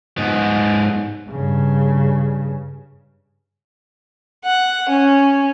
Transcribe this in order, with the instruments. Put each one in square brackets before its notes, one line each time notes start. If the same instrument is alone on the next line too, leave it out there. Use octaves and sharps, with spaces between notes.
[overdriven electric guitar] G#2 B3
[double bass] G2 C#3
[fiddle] F#5
C#4